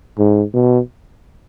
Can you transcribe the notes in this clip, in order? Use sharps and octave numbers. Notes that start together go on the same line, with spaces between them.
G#2
B2